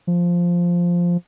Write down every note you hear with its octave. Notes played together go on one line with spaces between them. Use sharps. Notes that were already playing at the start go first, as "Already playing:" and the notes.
F3